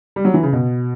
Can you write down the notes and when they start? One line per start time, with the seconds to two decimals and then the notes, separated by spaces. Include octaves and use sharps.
0.16 G3
0.25 F#3
0.34 E3
0.43 C#3
0.53 B2